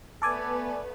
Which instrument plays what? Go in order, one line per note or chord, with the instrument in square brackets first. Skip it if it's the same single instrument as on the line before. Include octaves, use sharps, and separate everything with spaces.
[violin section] A3 B3 B4 [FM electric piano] A4 D5 G#5